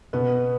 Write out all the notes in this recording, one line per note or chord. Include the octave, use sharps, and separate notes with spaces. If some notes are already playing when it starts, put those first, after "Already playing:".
B2 B3